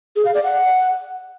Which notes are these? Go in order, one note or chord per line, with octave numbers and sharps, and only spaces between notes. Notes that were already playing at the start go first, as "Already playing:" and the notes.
G#4
F5
D5
F#5